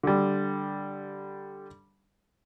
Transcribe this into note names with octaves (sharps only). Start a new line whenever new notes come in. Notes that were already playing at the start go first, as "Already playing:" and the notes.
D3 G3